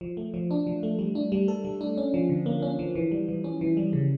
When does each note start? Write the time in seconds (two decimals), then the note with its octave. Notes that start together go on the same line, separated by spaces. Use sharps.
0.01 F3
0.17 A3
0.34 F3
0.51 D4
0.67 F3
0.83 A3
0.99 G3
1.15 D4
1.32 G3
1.48 A4
1.65 G3
1.81 D4
1.98 C#4
2.14 F3
2.29 D3
2.46 A#3
2.62 C#4
2.79 F3
2.95 E3
3.11 G3
3.29 E3
3.44 C#4
3.61 E3
3.77 G3
3.93 C#3